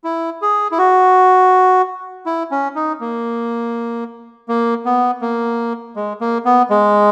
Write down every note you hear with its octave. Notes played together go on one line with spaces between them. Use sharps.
E4
G#4
E4
F#4
E4
C#4
D#4
A#3
A#3
B3
A#3
G#3
A#3
B3
G#3